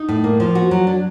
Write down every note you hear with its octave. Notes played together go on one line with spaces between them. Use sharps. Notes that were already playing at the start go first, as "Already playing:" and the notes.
Already playing: D#4
A2
A#3
F3
F#4
F#3
D4